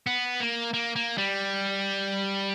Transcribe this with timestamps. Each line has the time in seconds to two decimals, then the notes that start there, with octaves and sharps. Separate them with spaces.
0.07 B3
0.40 A#3
0.73 A#3
0.96 A#3
1.18 G3